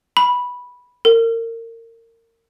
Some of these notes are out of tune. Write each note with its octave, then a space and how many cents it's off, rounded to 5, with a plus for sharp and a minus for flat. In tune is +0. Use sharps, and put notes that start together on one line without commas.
B5 -10
A#4 -30